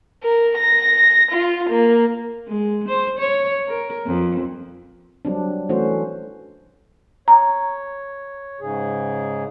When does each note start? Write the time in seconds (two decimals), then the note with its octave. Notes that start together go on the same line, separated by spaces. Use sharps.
0.23 A#4
0.58 A#6
1.31 F4
1.70 A#3
2.47 G#3
2.88 C5
3.19 C#5
3.68 A#4
4.06 F2
5.25 F#3 G3 C4 D4
5.69 E3 A3 C#4 F#4 C5
7.28 C#5 A#5
8.61 G#2 C#3 G#4